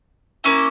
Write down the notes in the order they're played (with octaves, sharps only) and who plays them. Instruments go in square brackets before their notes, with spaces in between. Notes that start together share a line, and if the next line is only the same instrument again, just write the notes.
[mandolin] A#3 C#4 E4